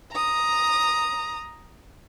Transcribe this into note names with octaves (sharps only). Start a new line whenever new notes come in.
A#5 D#6